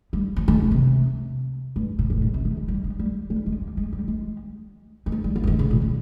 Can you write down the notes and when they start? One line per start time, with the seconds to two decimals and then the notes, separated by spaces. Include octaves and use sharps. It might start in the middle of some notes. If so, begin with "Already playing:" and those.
0.13 G3
0.36 F3
0.48 D#3
0.60 C#3
0.71 C3
1.76 G2
1.99 A#2
2.10 G2
2.17 C3
2.22 A#2
2.34 C3
2.45 D#3
2.57 G#3
2.68 G3
2.84 G#3
2.99 G3
3.30 G3
3.46 G#3
3.61 A#3
3.77 G#3
3.93 G3
4.08 G#3
5.06 D#3
5.12 F3
5.24 G3
5.36 A#3
5.44 F3
5.47 D#3
5.59 C#3
5.71 A#2
5.82 C#3